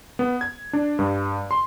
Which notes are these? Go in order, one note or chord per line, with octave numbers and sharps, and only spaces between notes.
B3
G#6
D4
G2
C6